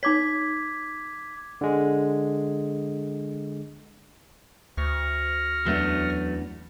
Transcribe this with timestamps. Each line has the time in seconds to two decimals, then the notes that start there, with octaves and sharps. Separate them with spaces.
0.03 D#4 C#5 D6 G#6 B6
1.61 D3 G#3
4.77 D2 C#6 F6 A#6
5.66 E2 F#3 A3 B3 C#4 D4